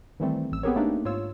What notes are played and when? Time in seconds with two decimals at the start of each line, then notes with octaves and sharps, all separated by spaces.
0.20 D#3 E3 G3 A3 C4
0.52 A1 E6
0.63 B3 C4 G4 G#4 A#4 C#5
0.76 A3 A#3 D4 D#4 G4
1.05 G#2 F4 C#5 E6